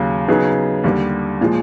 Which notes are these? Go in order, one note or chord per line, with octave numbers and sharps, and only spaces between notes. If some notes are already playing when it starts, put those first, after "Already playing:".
Already playing: D#2 C#3 F#3
C#3 F#3 B3 D#4 G#4
D#2 D3 G3
A#2 F3 G#3